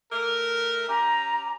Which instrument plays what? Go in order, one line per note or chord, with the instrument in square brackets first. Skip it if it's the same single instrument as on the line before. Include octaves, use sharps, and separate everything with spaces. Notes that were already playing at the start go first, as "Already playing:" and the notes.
[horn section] A3 A#4
[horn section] C#4 G4 [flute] A#5